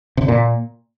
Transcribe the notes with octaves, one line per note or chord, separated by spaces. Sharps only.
C3
D3
A#2